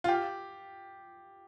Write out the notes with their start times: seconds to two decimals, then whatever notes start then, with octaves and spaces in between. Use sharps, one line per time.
0.04 F4
0.08 G4